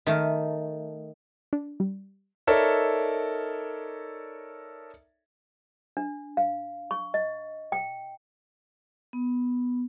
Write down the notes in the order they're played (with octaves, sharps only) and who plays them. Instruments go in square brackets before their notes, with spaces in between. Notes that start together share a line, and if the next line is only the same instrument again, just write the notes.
[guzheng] D#3 A3
[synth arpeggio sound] D4
G3
[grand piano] D#4 A4 A#4 C#5 D5 E5
[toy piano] D4
F5
C#6
D#5
G5
[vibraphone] B3